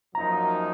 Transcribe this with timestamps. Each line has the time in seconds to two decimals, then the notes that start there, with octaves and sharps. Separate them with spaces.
0.15 F#2 F3 A#3 D#4 F#4 A#5